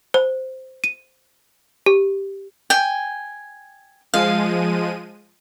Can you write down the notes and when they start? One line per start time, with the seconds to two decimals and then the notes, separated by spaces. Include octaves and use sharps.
0.14 C5
0.84 D#7
1.86 G4
2.70 G5 G#5
4.14 F3 G#3 F5 D#7